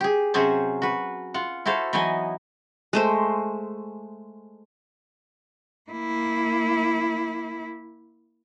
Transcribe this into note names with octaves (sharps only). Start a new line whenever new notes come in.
G4 G#4
C3 F#3 C#4 G#4 C5 A5
F#4 B4
F4 F#5
E4 F#4 A4 C5 F5
E3 F#3 B3 D#4 D#5 G#5
G#3 A3 C5
A#3 E4